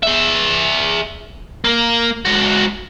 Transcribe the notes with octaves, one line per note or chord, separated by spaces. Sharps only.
G#4 E5
A#3
G#3 F#4